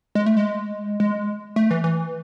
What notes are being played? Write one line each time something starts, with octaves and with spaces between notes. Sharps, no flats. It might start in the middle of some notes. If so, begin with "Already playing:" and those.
G#3
A3
G#3
G#3
A3
E3
E3